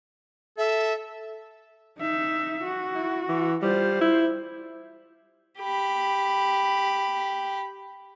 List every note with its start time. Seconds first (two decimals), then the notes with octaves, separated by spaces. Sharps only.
0.58 A4 E5
1.98 D#4 E5
2.63 F#4
2.95 E4
3.28 E3
3.62 G3 F4 C5
4.01 E4
5.59 G4 B5